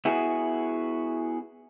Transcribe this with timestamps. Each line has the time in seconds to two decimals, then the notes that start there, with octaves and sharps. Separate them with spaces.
0.05 B3 E4 F#4 G#4